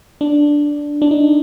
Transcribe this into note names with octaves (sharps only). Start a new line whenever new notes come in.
D4
D4
D#4